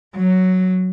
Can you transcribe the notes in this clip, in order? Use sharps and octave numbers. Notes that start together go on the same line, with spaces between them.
F#3